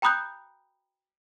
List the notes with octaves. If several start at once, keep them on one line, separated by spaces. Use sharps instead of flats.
G5 A#5 B5 D#6 F#6 G6